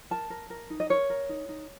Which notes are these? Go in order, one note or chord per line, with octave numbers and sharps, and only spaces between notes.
A#4 A5
A#4
A#4
D#4
D#5
A#4 C#5
A#4
D#4
D#4